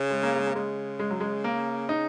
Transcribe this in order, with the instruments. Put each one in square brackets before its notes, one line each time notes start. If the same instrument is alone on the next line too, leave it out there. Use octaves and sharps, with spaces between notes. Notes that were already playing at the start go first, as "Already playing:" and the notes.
Already playing: [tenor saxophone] C#3
[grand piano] G#3
A#3
G#3
A#3
[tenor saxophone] C#3 [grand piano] G#3
[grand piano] G#3
F#3
G#3
A#3
D#4